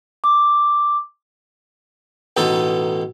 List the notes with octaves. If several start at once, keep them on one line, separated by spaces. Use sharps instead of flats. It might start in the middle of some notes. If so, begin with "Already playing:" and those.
D6
A1 B2 D#4 A4